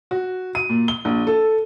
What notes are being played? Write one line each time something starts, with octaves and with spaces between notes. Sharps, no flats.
F#4
D#7
A#2
G7
A#1
A4